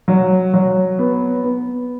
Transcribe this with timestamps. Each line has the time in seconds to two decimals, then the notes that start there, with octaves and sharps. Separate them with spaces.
0.08 F#3
0.54 F#3
0.99 B3
1.44 B3